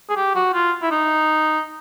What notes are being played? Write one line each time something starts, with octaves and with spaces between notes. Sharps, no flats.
G#4
G4
F#4
F4
E4
D#4